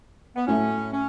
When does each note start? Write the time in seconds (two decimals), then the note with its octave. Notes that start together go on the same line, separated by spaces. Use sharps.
0.36 B3
0.47 A2 F#3 A3 C#4
0.93 C#4